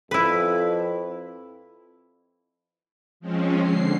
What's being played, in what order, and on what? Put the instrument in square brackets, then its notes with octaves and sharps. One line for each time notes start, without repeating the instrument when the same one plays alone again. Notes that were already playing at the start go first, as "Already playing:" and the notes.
[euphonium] F2 [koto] E4 B4
[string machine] F3 G#3 C4 C#4
D3 C7